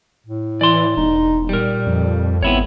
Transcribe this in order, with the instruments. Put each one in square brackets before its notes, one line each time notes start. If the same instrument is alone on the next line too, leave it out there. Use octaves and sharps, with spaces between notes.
[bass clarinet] A2
[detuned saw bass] E3 [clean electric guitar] D5 C6
[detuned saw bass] E1 [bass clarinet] D#4
[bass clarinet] A#2 [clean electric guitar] G3 A#4
[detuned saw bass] F2
[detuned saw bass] G#1 [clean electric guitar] B3 E4 C#5 [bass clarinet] C4